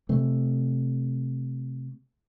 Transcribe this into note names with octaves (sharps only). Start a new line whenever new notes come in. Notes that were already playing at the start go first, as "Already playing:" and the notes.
C3 A3